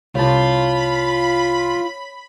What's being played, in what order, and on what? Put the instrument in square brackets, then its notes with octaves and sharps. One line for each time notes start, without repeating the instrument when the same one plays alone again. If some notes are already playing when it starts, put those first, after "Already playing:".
[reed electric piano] C2 A5 [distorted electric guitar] F4 [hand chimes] C#5 [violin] B5